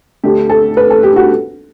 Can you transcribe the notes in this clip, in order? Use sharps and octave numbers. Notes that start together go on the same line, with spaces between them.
D2 D3 A3 D4 G4
A4
B4
A4
G4
F#4